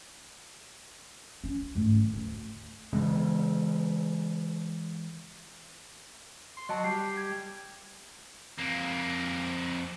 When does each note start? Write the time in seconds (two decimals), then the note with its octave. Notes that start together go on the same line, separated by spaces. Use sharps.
1.44 C#4
1.75 G#2 A3
1.92 D#3
2.14 D2
2.93 C#3 E3 G#3 B3
6.57 C6
6.69 F#3 D#5 A5
6.84 G3 C7
7.17 G#6
8.58 F2 A#3